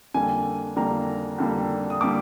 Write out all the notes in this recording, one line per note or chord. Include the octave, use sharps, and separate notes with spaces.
F2 D3 G3 A#3 G#5
F2 D3 G3 A#3 A#5
F2 D3 G3 A#3
D#6
D3 G3 A#3 D6